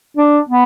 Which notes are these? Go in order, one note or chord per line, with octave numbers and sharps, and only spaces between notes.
D4
B3